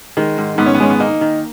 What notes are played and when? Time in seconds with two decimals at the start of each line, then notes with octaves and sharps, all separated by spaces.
0.17 D#3 G#3
0.38 G#2
0.58 G#2 B3
0.66 C#4
0.75 B3
0.80 G#3 C#4
0.90 B3
1.00 A#3 D#4
1.21 D#3